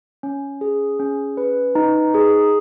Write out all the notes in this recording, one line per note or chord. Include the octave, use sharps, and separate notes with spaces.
C#4
G#4
C#4
B4
D#4
G#4